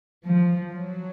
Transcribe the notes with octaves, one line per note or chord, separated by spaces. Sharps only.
F3
F#3